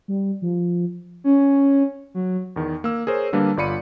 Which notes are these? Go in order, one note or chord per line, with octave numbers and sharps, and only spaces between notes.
G3
F3
C#4
F#3
E2 D#3
A#3 E6
G#4 A#4 C5 C#5
D3 G3 A#3 D4 B4
G1 F4 D5 B5 C#7 D#7